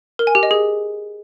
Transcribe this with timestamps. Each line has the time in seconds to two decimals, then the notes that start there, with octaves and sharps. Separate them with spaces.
0.19 A#4
0.27 G#5
0.35 G4
0.43 D#5
0.51 G#4